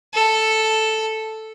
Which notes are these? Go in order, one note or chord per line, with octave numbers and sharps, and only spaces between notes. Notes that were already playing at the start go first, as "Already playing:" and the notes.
A4